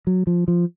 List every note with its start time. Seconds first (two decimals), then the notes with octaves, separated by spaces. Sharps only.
0.07 F#3
0.27 F3
0.48 F3